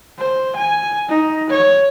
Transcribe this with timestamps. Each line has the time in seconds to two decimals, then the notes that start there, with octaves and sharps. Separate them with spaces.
0.19 C5
0.56 G#5
1.09 D#4
1.50 C#5